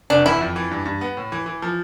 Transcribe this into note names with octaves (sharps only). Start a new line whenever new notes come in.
F1 D4
E2 E4
F2
E3
G2
G2
B3
A2
E3
E3
F3